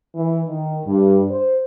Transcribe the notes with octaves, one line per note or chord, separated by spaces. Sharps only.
E3
D#3
G2
C5